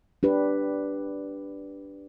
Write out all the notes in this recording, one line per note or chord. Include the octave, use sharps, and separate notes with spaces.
D4 G4 B4